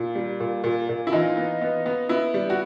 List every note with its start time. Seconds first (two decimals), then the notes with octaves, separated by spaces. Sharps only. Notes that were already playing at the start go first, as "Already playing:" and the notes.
Already playing: A#2
0.15 G3
0.40 A#2
0.64 A#2
0.89 A#2
1.07 E4
1.12 E3 D#4 F4
1.37 B3
1.61 B3
1.86 B3
2.09 B3 E4
2.34 G3
2.50 F#4